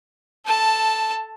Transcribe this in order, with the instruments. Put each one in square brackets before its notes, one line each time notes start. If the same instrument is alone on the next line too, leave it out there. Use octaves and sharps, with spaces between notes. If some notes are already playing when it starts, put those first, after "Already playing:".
[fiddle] A4 A5